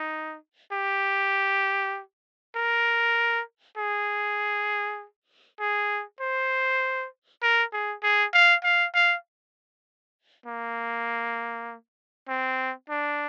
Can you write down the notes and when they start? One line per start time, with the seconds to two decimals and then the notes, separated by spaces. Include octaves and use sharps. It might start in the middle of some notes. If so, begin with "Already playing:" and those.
Already playing: D#4
0.73 G4
2.56 A#4
3.78 G#4
5.60 G#4
6.21 C5
7.42 A#4
7.73 G#4
8.03 G#4
8.34 F5
8.65 F5
8.95 F5
10.47 A#3
12.29 C4
12.90 D4